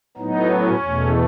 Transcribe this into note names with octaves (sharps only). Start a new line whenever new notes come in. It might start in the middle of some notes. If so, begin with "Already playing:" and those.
A2 F#3 B3 D#4
C#4
E2 B2 A3